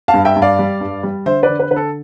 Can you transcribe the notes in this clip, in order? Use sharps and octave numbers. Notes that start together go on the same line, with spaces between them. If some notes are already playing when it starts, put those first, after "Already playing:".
F5 A5
G2
E5 G5
G2
D5 F5
G3
G2
G3
D3 C5 E5
B4 D5
D3
B4
D3 B4
A4